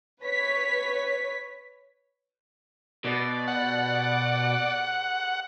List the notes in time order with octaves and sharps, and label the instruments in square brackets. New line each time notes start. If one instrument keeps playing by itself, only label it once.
[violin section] B4 C#5 B6
[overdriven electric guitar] B2 [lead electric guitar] D5
[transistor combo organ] F#5